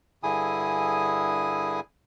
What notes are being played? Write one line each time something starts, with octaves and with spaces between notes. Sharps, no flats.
G2 D3 E4 G#4 G#5 D#6